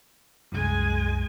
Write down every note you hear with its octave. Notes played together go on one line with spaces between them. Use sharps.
C2 F#2 G#3 G#5